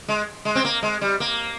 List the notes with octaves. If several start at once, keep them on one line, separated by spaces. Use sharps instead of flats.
G#3
G#3
C4
A#3
G#3
G3
A#3